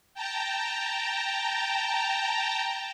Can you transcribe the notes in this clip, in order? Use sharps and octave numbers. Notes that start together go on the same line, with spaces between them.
G5 A5 A#5